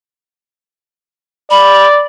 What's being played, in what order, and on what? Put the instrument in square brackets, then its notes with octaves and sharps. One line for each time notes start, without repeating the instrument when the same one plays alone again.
[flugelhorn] D5 [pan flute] B5